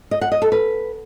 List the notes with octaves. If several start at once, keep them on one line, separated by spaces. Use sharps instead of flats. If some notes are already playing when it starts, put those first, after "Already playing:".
D#5
F#5
D#5
A4
B4